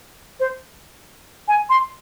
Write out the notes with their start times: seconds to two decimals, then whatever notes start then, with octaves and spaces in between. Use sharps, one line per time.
0.40 C5
1.48 G#5
1.69 C6